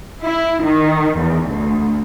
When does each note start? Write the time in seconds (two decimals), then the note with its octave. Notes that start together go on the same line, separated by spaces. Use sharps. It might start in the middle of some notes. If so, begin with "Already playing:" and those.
0.22 E4
0.63 D#3
1.17 E2
1.50 D2